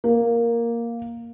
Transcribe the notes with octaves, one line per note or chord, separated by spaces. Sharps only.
A#3